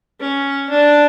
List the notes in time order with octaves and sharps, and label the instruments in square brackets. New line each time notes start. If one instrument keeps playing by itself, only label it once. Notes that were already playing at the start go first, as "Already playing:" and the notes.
[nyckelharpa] C#4
D4